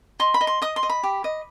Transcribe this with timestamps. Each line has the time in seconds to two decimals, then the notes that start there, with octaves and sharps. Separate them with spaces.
0.20 D#5 C6
0.34 B5
0.41 D#5
0.47 C6
0.62 D#5 D#6
0.76 C6
0.83 D#5
0.90 B5
1.03 G4
1.24 D#5